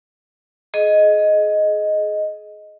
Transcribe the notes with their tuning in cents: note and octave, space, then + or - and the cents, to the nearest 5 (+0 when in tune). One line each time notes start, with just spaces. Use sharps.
G#4 +30 D#5 +0